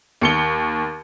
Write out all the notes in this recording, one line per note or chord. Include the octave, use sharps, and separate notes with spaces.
D#2 C#7 G7